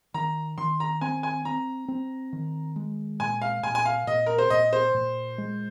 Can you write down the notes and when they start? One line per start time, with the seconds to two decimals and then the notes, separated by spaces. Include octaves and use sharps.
0.14 D#3 A#5
0.58 D#3 C6
0.80 A#5
1.01 C4 G#5
1.23 G#5
1.45 C4 A#5
1.88 C4
2.33 D#3
2.76 G#3
3.20 A#2 G#5
3.41 F5
3.63 A#2 G#5
3.75 G#5
3.85 F5
4.07 A#2 D#5
4.26 A#4
4.38 C5
4.50 A#2 D#5
4.73 C5
4.94 A#2
5.38 G#3